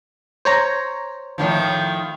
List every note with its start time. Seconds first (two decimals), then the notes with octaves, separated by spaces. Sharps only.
0.45 C5 C#5 A#5
1.38 A2 D#3 F3